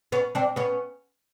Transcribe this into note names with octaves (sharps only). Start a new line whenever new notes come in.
B3 C#4
C4 D4
B3 C#4